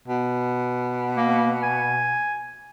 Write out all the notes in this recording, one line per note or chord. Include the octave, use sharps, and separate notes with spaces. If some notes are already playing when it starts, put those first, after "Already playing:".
B2
A#3
G#5